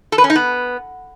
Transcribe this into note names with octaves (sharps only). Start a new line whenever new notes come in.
A4
B4
C#4
D#4
B3